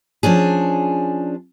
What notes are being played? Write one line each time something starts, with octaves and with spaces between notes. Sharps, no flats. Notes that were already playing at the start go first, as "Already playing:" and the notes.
F3 C#4 D4 G#4